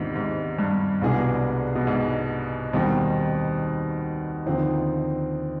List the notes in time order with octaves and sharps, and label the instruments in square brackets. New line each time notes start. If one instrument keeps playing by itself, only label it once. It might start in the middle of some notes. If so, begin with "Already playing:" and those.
Already playing: [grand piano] D#2 D#3 B3 D4 F4 [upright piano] G#2 C3
[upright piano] G#2
G2
[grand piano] C2 B2 G#3 D4 G#4
[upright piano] B2
G#2
[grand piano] D#2 D#3 G3 C4 D#4 [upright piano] B2
[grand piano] D#2 D3 F3 C4 D#4